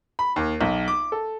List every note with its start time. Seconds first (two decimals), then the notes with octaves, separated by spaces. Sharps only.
0.19 B5
0.36 D#2
0.61 B1
0.88 D6
1.12 A4